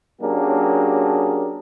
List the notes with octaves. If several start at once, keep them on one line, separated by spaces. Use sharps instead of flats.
F#3 A#3 C#4 D4 G4 G#4